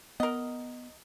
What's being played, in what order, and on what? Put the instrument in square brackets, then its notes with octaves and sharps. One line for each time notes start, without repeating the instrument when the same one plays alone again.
[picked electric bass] B3 [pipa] A#4 D#5